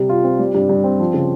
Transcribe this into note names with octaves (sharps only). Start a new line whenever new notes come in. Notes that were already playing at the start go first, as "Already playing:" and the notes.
Already playing: C3 G3
F4
C4
G3
G2
G2
C4
F3
C#3